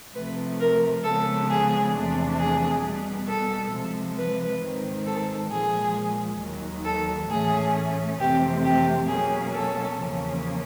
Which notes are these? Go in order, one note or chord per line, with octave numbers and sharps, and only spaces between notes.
C3 F3 A3 B4
A#4
C#3 F3 G#3 B3 A4
G#4
E2 C3 F3 A3 D4
G#4
B2 G3 B3
A4
C3 F3 G#3
B4
G#2 D#3 G#3 C4
A4
A#2 F3 G#3 G#4
D#2 D#3 F#3
A4
A2 E3 A3 C#4 G#4
F2 C3 E3 A3 C4 G4
G4
B2 F#3 A#3 C#4 G#4
A4
E2 C#3 F3 A#3 C#4